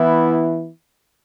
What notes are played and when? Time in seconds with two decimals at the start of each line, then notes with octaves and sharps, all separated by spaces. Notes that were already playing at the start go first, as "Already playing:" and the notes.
Already playing: E3 B3 E4